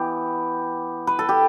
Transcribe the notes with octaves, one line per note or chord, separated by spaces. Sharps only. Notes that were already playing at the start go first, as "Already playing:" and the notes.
Already playing: E3 B3 G4
B4
A4
G4